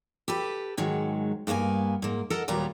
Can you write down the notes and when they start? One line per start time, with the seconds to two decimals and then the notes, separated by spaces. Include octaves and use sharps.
0.28 G4 A4 B4
0.77 G#2 D#3 F#3 G#3
1.47 G2 A#3 B3 C5 G#5
2.02 G#2 A#3
2.30 A4 A#4 D#5 F#5
2.48 D#2 A#2 F#3 G3 B3 A#5